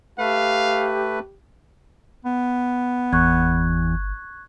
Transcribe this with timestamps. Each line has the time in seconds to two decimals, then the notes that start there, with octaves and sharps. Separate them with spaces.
0.18 A3 G4 B4 F5
2.25 B3
3.12 G1 E2 C#6 F#6 G#6